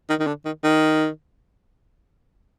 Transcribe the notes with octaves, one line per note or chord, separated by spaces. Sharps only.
D#3
D#3
D3
D#3
D#3